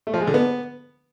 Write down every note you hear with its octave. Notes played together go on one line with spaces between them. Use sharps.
A3
F3
G#3
D3
B3